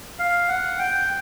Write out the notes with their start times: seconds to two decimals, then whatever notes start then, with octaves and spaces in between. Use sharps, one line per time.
0.19 F5
0.49 F#5
0.79 G5